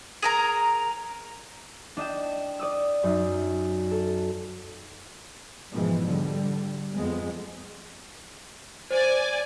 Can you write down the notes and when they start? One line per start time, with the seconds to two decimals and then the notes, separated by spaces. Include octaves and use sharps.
0.22 G#4 A#4 A#5
1.97 D4 D#5 G5 E7
2.59 D5 D#6 E6
3.03 F#2 D#4
3.91 A4
5.72 G#2 B2 E3 F3 G#3
6.08 D3 G3
6.93 F2 F3 G#3 B3
8.91 C5 D5 G#5